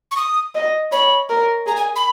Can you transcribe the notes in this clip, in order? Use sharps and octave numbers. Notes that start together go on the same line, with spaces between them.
C#6
D#6
D#5
C#5 B5
A#4
G#4 A#5
G#5
B5